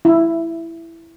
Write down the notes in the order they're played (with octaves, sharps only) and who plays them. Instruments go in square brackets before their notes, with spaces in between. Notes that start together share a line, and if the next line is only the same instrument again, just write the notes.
[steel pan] E4